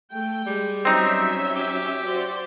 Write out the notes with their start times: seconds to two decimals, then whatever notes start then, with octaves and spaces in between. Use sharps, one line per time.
0.12 A3 G5
0.47 G3 G#3
0.85 F#3 C4 C#4 D#4 E5
1.56 G4
2.04 F#4 C5 D5